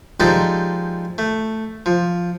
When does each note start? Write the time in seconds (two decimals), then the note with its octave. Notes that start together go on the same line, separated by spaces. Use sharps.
0.20 F3 G#3 D#4 G4 A4 D5
1.18 A3
1.86 F3